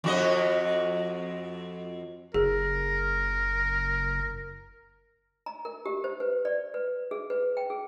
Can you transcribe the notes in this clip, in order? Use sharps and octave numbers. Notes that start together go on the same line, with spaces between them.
F2 F#4 D#5
F#1 G#4 A#4
A#5
A#4
G4
C5
B4
D5
B4
G#4
B4
G5
G#4